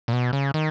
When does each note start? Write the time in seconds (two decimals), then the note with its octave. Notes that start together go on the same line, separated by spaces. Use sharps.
0.08 A#2
0.13 B2
0.33 C#3
0.54 D#3